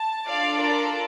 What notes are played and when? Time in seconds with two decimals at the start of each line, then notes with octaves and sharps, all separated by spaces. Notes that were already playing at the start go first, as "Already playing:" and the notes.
Already playing: A5
0.28 D4 F4 A4 D5 F5
0.59 A#4 D5